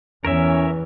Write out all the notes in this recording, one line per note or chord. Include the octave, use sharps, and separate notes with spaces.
E2 E3 C#4 A#4 C#5 E5